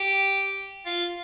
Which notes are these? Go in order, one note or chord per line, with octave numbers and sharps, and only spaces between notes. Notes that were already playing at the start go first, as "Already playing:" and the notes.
Already playing: G4
F4